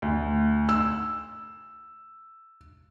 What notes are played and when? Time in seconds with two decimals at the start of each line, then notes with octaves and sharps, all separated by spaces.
0.02 D2
0.69 E6